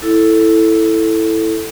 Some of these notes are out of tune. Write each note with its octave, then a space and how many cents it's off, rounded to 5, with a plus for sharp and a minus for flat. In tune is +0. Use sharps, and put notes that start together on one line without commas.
E4 +0 A4 +0